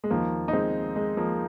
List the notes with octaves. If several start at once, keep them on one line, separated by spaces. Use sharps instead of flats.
G#3
D#2 D#3 F3 A#3
D#4
G#3 C4
G#3
F3 A#3